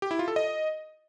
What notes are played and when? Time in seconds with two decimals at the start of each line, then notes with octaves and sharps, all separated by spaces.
0.02 G4
0.11 E4
0.19 F4
0.28 A4
0.36 D#5